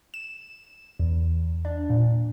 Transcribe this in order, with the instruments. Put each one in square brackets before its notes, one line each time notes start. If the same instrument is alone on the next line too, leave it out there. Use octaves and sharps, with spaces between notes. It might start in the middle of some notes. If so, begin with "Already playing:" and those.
[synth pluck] E7
E2
D4
A#2